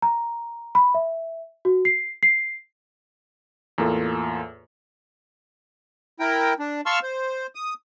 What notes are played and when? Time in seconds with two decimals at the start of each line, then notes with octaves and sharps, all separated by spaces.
0.02 A#5
0.75 B5
0.94 E5
1.65 F#4
1.85 C7
2.23 C7
3.78 E2 A2 A#3 F4 A4
6.20 E4 A#4 G5
6.59 D4
6.86 F5 A5 C6 C#6 E6 F6
7.03 C5
7.55 D#6